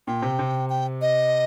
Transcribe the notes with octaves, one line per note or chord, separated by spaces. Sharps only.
A#2 G5
C3
C3
G5
D#5